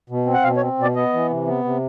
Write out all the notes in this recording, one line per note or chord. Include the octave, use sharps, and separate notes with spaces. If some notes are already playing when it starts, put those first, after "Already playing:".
B2
C4
F#5
B2 F5
C#5
C4
B2 D5
B3 D#5
E3
C3
B3
C3